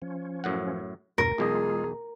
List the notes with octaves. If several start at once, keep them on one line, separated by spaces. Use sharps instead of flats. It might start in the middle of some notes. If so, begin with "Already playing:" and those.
F3 C#4
F#2 A2 F#5
E2 G2 B2 A#4 A#5
B1 E2 G#3 F4 G#4 D#5